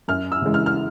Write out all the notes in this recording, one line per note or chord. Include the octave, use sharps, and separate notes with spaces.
F#2 F6
E6
C#3 E3 G#3
F6
F6